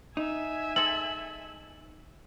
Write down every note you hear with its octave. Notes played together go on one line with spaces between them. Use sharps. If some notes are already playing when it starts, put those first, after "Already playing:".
D#4 E5 G#5
G#3 A4 F#7